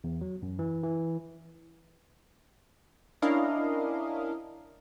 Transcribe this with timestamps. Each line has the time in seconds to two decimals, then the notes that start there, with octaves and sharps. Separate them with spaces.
0.04 E2
0.21 F#3
0.42 F#2
0.59 E3
0.83 E3
3.22 C#4 D4 E4 A#4 D#5 F5